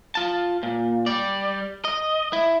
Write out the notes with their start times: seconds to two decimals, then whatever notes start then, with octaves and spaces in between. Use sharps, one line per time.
0.15 F4 A5
0.63 A#2
1.06 G3 D5
1.85 D#5
2.33 E4